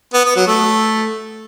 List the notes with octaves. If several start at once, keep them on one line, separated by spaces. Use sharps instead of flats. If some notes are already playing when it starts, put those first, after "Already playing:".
B3
B3
F#3
A3